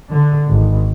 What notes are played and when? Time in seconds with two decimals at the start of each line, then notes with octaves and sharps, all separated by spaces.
0.11 D3
0.49 G#1